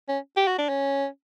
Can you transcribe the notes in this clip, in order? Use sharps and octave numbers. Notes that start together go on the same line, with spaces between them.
C#4
G4
F#4
D4
C#4